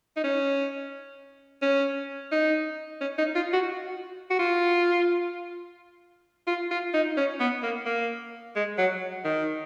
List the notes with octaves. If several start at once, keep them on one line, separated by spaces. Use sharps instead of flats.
D#4
C#4
C#4
D#4
C#4
D#4
F4
F#4
F#4
F4
F4
F4
D#4
C#4
B3
A#3
A#3
G#3
F#3
D#3